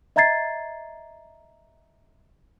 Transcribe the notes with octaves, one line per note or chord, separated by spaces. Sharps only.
D#5 E5 A#5 G#6 A6 C7